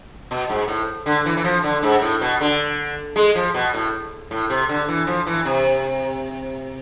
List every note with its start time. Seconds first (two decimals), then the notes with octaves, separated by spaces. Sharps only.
0.31 B2
0.49 G#2
0.68 A2
1.06 D3
1.26 E3
1.37 E3
1.44 F3
1.64 D3
1.83 G#2
2.01 A2
2.21 B2
2.41 D3
3.16 G#3
3.35 F3
3.54 B2
3.74 A2
4.31 A2
4.50 C3
4.69 D3
4.88 E3
5.07 F3
5.27 E3
5.45 C3